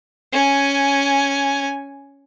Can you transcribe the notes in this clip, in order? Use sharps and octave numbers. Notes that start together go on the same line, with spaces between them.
C#4 G#5